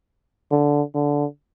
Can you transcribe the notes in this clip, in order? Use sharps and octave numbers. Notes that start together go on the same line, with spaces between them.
D3
D3